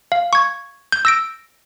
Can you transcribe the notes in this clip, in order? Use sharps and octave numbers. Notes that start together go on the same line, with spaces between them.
F5
C#6 G#6
G6
E6 A#6 D7